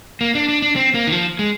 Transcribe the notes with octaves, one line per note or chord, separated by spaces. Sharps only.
A#3
D4
D4
D4
C4
A#3
D#3
F3
G#3